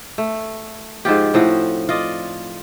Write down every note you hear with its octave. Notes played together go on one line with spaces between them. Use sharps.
A3
G#2 F3 F4 G4
A2 F3 C4 F#4
F4 D5 D#5